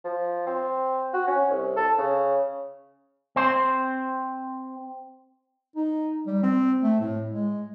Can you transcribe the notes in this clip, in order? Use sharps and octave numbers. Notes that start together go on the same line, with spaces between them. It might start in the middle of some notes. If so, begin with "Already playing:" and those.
F3
C4
F#4
C#4
C2
A4
C#3
C4 C5
D#4
G3
C4
A3
A2
G#3